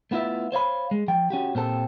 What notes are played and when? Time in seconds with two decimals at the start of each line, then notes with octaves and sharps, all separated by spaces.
0.11 A3 B3 E4 F4 E5
0.52 C5 C#5 F5 B5
0.91 G#3
1.08 F3 G5
1.30 C#4 F#4 G4
1.55 A#2 C4 G4 A4